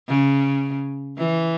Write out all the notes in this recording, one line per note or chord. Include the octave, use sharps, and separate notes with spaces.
C#3
E3